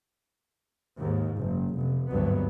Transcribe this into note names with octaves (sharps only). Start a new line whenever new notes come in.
D#2 G#2
F#1
F1
G#1 D2 G2 F#3 B3